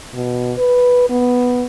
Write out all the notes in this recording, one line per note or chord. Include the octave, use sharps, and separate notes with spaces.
B2
B4
B3